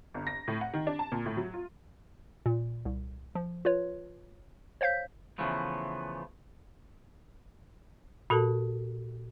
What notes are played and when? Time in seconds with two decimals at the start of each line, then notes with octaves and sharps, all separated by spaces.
0.14 G1
0.27 A#6
0.48 A2
0.61 F#5
0.74 D#3
0.87 D4
0.99 A5
1.12 A#2
1.26 A2
1.37 F#3
1.54 F4
2.46 A#2
2.85 C2
3.35 F3
3.65 F4 B4 C#5
4.81 C5 C#5 F5 G6 B6
5.38 C#3 E3 F3 A3 B3
8.30 A#2 F#4 A4 A#4 A5